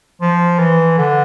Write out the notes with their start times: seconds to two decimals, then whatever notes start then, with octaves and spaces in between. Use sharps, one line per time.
0.21 F3
0.59 E3
0.98 D3